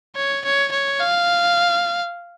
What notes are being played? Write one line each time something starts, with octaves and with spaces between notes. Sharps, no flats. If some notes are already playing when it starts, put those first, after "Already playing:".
C#5
C#5
C#5
F5